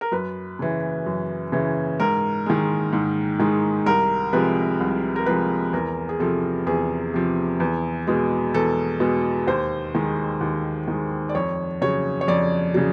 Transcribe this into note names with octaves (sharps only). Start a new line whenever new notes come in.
A#4
F#2 B4
C#3 E3
F#2
C#3 E3
G#2 A#4
D#3 G#3
G#2
D#3 G#3
C2 A#4
C3 F3 G#3 B4
C2
A#4
C3 F3 G#3 B4
E2 A#4
G#4
C3 F3 A4
E2 G#4
C3 F3
E2
B2 G#3
E2 A4
B2 G#3
D#2 C5
D#3 G#3
D#2
D#3 G#3
D5
F2 C#5
C#3 F#3 C#5
C#5
F2 D5
C#3 F#3